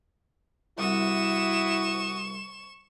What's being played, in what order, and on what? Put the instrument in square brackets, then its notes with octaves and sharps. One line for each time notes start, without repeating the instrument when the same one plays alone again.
[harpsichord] C2 [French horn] E4 [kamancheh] F#4 D#6 [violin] C#6 E7